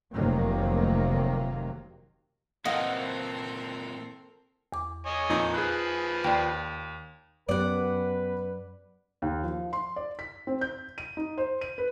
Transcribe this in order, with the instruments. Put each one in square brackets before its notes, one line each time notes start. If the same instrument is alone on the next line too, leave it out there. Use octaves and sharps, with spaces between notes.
[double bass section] F1 C3 D#3 F#3 A#3
[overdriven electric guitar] A#2 E3 [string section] C4 A4 A#4 [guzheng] D#5 [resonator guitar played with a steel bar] F5 F#5
[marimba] E2 D6
[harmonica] C#5 D#5 G#5
[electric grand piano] F2 A#2 D#4
[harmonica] F3 B4 [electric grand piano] G#4 F#6
[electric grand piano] D#2 [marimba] D5 G5
[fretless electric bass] F#2 [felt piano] B3 G4 [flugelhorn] B4 [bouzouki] D5 F#5
[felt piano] D#2
F3
C6
D5
B6
C4
G6
D#7
D#4
C5
D#7
B4